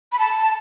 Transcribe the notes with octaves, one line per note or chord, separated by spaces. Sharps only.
B5
A5